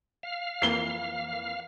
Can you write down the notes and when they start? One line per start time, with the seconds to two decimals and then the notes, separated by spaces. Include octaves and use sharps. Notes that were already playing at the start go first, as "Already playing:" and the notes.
0.23 F5
0.62 F2 E3 A#3 C7 G7